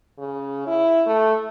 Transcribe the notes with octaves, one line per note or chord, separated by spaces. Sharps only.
C#3
E4
A3